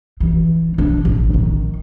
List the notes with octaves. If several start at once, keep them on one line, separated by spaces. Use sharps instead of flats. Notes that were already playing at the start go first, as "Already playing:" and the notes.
E3
D4
A1
D#3